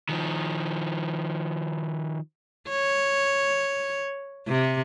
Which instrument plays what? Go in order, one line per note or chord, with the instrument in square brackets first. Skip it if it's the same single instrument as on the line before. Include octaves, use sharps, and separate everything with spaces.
[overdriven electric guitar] D#3 F3
[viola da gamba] C#5
C3